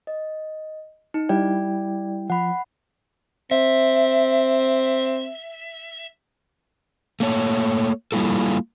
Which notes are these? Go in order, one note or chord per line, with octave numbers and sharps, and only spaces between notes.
D#5
D#4
G3 E4 D5 G5
F3 F#5 B5
C4 E5
A3 A#3 C#5
G3 A#3 E4 F4 A4